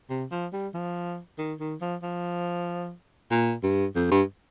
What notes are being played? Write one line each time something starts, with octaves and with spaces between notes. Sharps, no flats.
C3
F3
G3
F3
D#3
D#3
F3
F3
A#2
G2
F2
G2